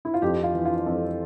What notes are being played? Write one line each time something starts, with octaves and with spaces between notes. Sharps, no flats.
E4
F4
F2 G4
F4
E3
F4
F2 A4